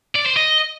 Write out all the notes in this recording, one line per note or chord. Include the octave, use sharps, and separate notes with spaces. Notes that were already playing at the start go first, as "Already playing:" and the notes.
D5
C5
D#5